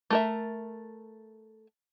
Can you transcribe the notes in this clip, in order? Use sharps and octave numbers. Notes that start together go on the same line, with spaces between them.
A3 A#4 E5